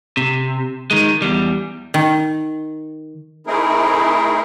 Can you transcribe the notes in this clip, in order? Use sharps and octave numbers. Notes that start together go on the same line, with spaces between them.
C3
D#3 G#3
E2 G3
D#3
A3 C4 D#4 E4 G#4 A#4